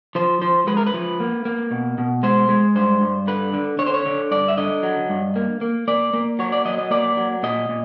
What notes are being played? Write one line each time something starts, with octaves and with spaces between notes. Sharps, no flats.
F3 C5
F3 C5
G#3 B4
A#4
B4
F3
A#3
A#3
B2
B2
G#3 C5
G#3
G2 C5
G2
D3 B4
D3
D3 C#5
C5
C#5
D3
G2 D5
E5
D3 D#5
F#3
G2
A#3
A#3
A#3 D5
A#3
F#3 C#5
D5
F#3 D#5
D#5
A#3 D5
F#3
A#2 D#5
A#2